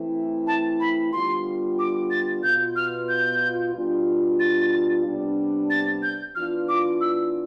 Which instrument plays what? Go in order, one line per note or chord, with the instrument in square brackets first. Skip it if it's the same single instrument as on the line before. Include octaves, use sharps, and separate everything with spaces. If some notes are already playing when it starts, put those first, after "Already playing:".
Already playing: [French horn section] E3 A3 C4 E4
[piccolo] A5
B5
[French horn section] D3 G3 B3 F4 [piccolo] C6
[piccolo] D6
A6
[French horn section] B2 B3 F4 [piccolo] G6
[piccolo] F6
G6
[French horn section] B2 G3 D4 F4
[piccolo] A6
[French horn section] C3 G3 B3 D4
[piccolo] A6
G6
[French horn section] E3 B3 D4 F4 [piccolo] F6
[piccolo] D6
E6